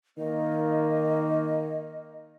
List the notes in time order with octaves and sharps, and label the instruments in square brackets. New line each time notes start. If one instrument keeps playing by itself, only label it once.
[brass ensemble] D#3 A#3 [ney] D#5